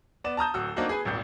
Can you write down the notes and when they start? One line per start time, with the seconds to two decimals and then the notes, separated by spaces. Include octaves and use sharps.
0.24 B3 D5 E7
0.37 A5 A#5 D#6 G6
0.54 D1 F#4 E6
0.76 A#3 C4 D4 D#4 F#4
0.89 G#4 B4 G#5
1.05 D#1 G#1 G6